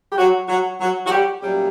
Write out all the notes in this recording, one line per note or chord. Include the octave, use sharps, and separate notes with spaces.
G4
F#3 F#4
F#3 F#4
F#3 F#4
F#4
G3 G4
A#2 F#3 G3 A3 C#4 G4